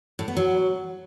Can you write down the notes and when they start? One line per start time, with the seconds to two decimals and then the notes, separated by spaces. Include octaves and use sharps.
0.19 A2
0.28 B3
0.37 F#3